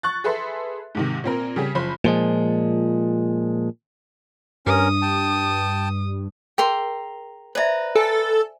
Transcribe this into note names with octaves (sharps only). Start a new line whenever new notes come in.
C#6 F#6 A6
G#4 A4 B4 E5 C6
G#2 C3 D#3
A#2 C4 A#4
C#3 G3 G4 G#4
F#1 F3 C5 B5
A#2 F3 G#3
G2 C#4 A#4 D#6
G5 A5
G#4 A#4 G5 A#5 C6
B4 C5 D5 E5 A#5
A4 G#5